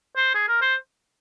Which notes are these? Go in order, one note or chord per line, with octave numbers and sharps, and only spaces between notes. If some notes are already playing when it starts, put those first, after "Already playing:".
C5
G#4
A#4
C5